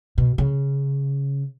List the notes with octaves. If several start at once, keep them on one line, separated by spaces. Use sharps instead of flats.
B2
C#3